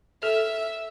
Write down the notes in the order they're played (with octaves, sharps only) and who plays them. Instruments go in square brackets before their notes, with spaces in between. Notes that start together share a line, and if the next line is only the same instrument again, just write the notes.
[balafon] A4 [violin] E5